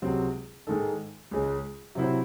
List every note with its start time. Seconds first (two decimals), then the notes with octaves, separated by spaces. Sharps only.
0.02 C#2 C3 F#3 C4
0.67 G#2 D#3 G#3 D#4 A4
1.31 C#2 C#3 G#3
1.95 C3 F#3 C4 E4 C5